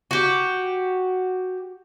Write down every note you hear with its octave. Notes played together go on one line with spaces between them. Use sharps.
F#4 G4